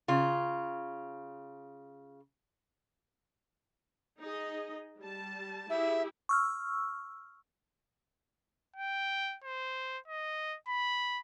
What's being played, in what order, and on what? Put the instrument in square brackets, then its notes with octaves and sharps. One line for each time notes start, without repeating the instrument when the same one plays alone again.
[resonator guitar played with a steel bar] C#3 F4
[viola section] D#4 G#4 D#5
G3 A5
[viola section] E4 G4 G#4 [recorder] E5
[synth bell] C#6 E6 F6
[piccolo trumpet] G5
C5
D#5
B5